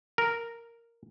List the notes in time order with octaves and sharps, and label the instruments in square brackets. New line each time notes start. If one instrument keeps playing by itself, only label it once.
[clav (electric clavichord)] A#4